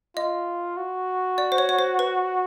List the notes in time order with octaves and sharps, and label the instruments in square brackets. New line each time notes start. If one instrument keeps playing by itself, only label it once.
[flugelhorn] F4 [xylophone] D#5
[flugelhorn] F#4
[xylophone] D5
C5
C#5
C#5
C5
B4